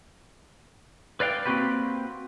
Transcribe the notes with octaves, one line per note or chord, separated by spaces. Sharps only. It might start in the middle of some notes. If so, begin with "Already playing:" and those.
B4 D5 F5 G5
A#3 C4 D4 F#4 G4 B4